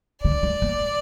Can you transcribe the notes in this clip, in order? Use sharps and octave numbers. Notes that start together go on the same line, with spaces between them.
D3 D5
A3
A#3